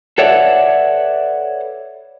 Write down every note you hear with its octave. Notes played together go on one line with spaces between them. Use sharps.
A4 B4 C#5 D5 E5 F#5